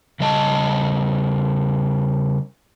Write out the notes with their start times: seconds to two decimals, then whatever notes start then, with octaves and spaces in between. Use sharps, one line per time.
0.20 C#3 G3 D#5 A5